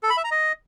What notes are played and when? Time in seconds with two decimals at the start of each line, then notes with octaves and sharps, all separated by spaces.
0.03 A4
0.10 B5
0.17 E5
0.24 A#5
0.31 D#5